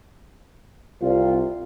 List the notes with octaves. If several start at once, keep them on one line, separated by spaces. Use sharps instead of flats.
C2 F4